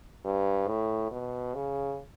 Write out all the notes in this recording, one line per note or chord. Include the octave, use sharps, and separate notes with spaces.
G2
A2
B2
C#3